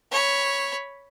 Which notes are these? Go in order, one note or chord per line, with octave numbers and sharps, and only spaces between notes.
C#5 B5